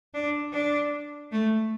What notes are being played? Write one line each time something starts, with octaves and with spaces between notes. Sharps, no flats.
D4
D4
A3